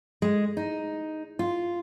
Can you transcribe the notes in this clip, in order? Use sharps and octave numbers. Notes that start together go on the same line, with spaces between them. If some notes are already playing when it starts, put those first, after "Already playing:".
G#3
D#4
F4